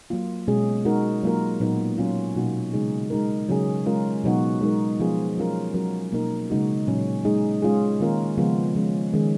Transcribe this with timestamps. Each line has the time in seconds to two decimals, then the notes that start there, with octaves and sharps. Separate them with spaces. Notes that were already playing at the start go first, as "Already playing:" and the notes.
0.10 F#3 A#3 F4
0.48 B2 G#3 C#4 G#4
0.85 G#3 D#4 F#4 A#4
1.23 F#3 A#3 F4 A#4
1.60 A#2 F#3 B3 D#4 A#4
1.98 F#3 C#4 F4
2.35 B2 F#3 A#3 D#4 F#4
2.73 C#3 G#3 D#4 G#4
3.10 G#3 D#4 A#4
3.49 C#3 F#3 C#4 G#4
3.86 G#3 C#4 F4 A#4
4.24 B2 F#3 B3 D#4 F#4
4.61 G#3 D#4 A#4
5.00 F3 B3 F4 G#4
5.37 F#3 C#4 F4 A#4
5.74 F#3 C#4 F#4 A#4
6.12 B2 A#3 D#4 A#4
6.50 C#3 G#3 D#4 F#4
6.87 A#2 F#3 C#4
7.25 G#3 D#4 G#4
7.62 G#3 C#4 F4 G#4
8.00 D#3 A#3 C#4 F4 A#4
8.38 C#3 F3 G#3 B3 F4
8.75 F3 G#3 C#4
9.13 D#3 G#3 C#4 G#4